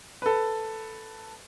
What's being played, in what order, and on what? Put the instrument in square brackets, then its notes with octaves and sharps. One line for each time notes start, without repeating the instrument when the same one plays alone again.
[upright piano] A4 B4